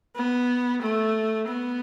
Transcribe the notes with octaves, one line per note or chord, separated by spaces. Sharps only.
B3
A3
B3